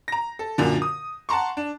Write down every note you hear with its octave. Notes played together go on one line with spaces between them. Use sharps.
A#5 A#6
A4
F#2 A#2 D3
D#6
F#5 A5 A#5 C6 C#6
D4